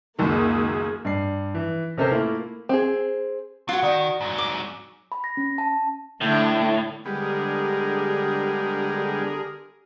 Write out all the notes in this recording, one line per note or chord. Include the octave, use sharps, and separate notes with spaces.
C#2 F#2 D#3 A#3 G#4
G2 D5 C7
E3
C3 C#4 A4 A#4 C5
A3 A#3 E4 F4
C4 G#4
F#3 F4 F#4
D#3 D5 G5 C#6
G#2 F#3
D6
B5
A#6
C#4
A5
A2 D3 A3 D4
D3 G3 G#3 B3 G4 G#4 A#4